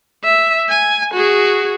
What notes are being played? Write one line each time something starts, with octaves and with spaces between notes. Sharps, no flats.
E5
G#5
F#4 G#4